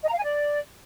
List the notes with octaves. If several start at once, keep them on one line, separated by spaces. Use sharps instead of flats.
D#5
A#5
F5
G#5
D5